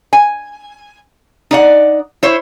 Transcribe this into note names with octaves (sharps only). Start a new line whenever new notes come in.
G#5
D#4 D5 F#5
E4 C5 C#5